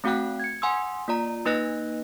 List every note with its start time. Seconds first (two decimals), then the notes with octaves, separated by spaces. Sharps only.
0.04 A3 C4 F#4 F#5 G5 F#6
0.40 G#6 C#7
0.62 F#5 G#5 C6 D#6 E6
1.08 A#3 F4 D5 A#5
1.45 A#3 D#4 B4 D#5 F#6 A#6